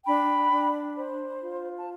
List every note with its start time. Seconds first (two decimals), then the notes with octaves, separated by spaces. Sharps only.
0.05 D4 G5 B5
0.51 D4
0.97 C5
1.42 F4
1.76 A5